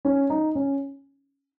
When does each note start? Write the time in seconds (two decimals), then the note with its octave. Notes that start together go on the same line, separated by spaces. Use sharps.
0.05 C#4
0.30 D#4
0.55 C#4